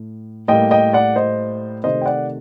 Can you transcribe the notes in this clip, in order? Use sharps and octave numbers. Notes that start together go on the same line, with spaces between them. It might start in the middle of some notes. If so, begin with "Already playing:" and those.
Already playing: A2
A2 G3 A#3 D#5 G5
D#5 G5
D5 F#5
C5 D#5
C3 D#3 A3 C5 D#5
G5
D5 F#5